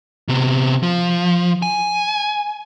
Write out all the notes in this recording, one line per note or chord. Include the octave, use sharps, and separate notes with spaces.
C3 B3
F3
G#5